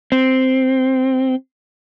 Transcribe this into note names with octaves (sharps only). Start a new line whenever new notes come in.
C4